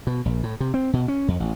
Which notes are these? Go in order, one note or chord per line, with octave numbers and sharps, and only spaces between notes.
B2
A#1
A2
C3
C4
B2
C#4
F2
A1